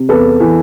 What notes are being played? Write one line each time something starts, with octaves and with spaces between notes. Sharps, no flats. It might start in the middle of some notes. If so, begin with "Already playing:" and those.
Already playing: C3
E2 A4 B4
E3